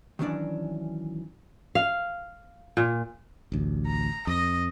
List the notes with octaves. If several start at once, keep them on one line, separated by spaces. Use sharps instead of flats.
D#3 E3 F#3 C#4 D4 D5
F5
A#2
A1 D2
A#5
F2 D#5